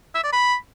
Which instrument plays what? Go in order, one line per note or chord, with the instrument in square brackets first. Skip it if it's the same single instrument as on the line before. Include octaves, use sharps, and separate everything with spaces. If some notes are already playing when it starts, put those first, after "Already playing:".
[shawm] E5
D5
B5